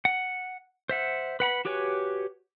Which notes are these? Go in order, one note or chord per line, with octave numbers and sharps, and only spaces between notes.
F#5
C5 E5 F#5
B4 F#5 B5
F#4 G4 B4 C#5 G#5